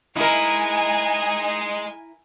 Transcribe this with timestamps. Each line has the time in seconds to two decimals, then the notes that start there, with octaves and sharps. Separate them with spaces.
0.16 G#3 D#4 E4 A#4 G#5